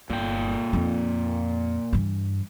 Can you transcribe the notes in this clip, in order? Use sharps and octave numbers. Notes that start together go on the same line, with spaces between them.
G1 A#2 G5
F2 D#4
G2 E3